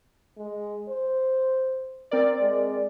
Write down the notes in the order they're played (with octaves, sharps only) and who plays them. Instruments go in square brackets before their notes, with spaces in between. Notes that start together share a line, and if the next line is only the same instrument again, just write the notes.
[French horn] G#3
C5
[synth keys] C4 A#4 D5
[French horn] G#3